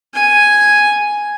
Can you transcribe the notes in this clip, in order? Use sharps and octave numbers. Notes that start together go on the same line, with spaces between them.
G#5